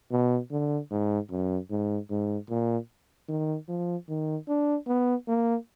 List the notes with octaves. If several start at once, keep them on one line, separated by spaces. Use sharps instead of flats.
B2
D3
G#2
F#2
G#2
G#2
A#2
D#3
F3
D#3
D4
B3
A#3